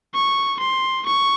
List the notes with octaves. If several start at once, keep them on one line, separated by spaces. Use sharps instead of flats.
C#6
C6
C#6